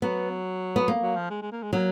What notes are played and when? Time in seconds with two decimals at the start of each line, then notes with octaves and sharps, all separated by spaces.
0.02 F#3 B3
0.76 B3
0.88 A#3
1.01 F#3
1.16 F3
1.30 G#3
1.42 G#3
1.52 A#3
1.63 G#3
1.73 F#3 A#3